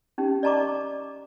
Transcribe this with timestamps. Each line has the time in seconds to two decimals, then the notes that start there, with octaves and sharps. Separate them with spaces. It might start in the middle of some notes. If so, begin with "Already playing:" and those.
0.18 C#4 D#4 G4
0.43 D5 D#5 A5 A#5 C#6 D6